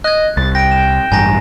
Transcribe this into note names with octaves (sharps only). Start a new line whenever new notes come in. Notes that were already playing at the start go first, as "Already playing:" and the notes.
D#5 F#6 G#6
C2 A6
G5 A#6 D7
E7
A1 G2 G#5 A#5 A#6